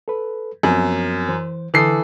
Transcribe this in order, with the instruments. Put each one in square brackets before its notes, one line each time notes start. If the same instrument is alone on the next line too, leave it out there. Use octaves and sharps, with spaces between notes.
[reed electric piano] A4 B4
[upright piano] F#2 [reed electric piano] F3 B3 C4
[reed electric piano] E3 C5
[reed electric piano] D3 D#6 [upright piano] E3 A4 C7